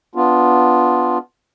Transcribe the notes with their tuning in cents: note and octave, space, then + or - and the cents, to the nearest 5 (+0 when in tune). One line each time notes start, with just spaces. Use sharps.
B3 +0 D4 -15 F4 +0